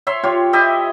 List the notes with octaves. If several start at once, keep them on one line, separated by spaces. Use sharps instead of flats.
C#5 E5 C6
F4 G4 C#5
E4 G4 D#5 E5